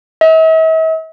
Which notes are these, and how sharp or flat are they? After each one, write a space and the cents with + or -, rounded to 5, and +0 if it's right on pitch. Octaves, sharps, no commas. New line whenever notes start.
E5 -45